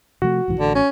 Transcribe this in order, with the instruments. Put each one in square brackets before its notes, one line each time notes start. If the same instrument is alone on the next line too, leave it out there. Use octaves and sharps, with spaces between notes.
[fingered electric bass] C3 F3 A3 [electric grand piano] F#4
[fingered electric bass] B1 G#2 E3
[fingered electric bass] A1 [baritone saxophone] D3
[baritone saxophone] C#4